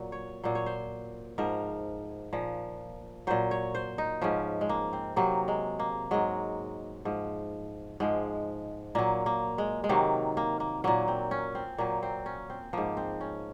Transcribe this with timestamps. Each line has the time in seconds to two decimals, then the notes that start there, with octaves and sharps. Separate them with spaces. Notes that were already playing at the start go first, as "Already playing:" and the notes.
Already playing: A#2 F#3
0.12 C#5
0.44 A#2 F#3 C5
0.55 C#5
0.66 C5
1.38 G#2 F3 A#4
2.33 A#2 F3
3.27 A#2 F#3 C5
3.51 C#5
3.75 C5
3.98 D#4
4.21 G#2 F3 C#4
4.61 G#3
4.69 A#3
4.93 C4
5.16 C3 F#3 A#3
5.48 G#3
5.79 A#3
6.11 G#2 F#3 G#3
7.05 G#2 F3
8.00 G#2 F3 G#3
8.95 A#2 F#3 A#3
9.26 A#3
9.58 G#3
9.84 G#3
9.89 C3 D#3 F#3 A#3
10.37 A#3
10.60 A#3
10.84 A#2 F#3 A#3
11.08 C4
11.31 C#4
11.55 C4
11.78 A#2 F#3 A#3
12.03 C4
12.26 C#4
12.50 C4
12.73 G#2 F3 A#3
12.97 C4
13.21 C#4